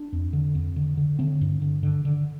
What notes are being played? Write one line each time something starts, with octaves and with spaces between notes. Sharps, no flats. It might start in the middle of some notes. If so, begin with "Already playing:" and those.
Already playing: D4
F2
D3
F2
D3
D3
D3 C4
G2
D3
D3
D3